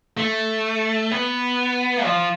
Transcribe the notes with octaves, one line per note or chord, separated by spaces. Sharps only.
A3
B3
F3